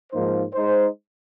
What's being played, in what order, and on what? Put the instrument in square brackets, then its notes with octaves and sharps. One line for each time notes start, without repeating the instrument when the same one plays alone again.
[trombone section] G#2 F3 A#3 D#4 C5
G#3 D#4 C5